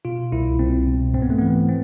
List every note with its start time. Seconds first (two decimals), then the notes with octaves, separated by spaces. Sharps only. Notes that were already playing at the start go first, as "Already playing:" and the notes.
0.05 B2 F4
0.32 C2 E4
0.59 C2 C4
0.87 B2
1.14 G#2 C4
1.22 B3
1.30 A3
1.38 E3 B3
1.69 C4